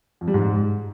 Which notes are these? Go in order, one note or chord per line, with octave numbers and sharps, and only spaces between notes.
F2
G3
G#2